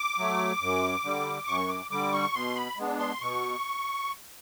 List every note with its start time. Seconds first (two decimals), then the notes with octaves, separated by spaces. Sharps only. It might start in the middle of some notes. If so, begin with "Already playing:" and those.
Already playing: D6
0.18 F#3 A3
0.61 F#2
1.04 D3 G3
1.47 F#2 C#6
1.69 D6
1.91 D3 G3 D6
2.12 C#6
2.34 B2 C6
2.56 B5
2.78 G#3 B3 D4
3.00 C6
3.21 B2 C#6